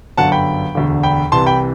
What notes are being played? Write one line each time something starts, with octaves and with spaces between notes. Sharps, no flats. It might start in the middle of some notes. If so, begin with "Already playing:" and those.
G1 F#2 D3 F#5 A5
G5 B5
E1 D2 D3
G5 B5
C2 C3 E3 A5 C6
G5 B5